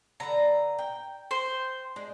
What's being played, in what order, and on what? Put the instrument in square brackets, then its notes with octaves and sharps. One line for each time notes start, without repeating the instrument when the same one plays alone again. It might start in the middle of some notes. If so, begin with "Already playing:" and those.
[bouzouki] D3 B4 A5 [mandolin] A#5
[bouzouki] G5
[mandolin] C5
[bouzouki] G#3 D4 G#4